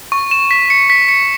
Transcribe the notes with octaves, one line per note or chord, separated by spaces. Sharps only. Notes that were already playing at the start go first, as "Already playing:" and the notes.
C#6
E7
B6
C#7
B6
C#7